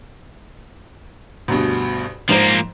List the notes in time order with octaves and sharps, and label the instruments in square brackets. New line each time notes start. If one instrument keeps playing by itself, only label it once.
[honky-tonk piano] D2 G2 B2
[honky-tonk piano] G#2 C5 A#5 [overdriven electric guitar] F3 A#3